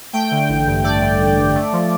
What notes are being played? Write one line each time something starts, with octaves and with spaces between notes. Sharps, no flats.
A3 G5
D3
A1
G2
A3 D5
D3
A1
G2
A3
F3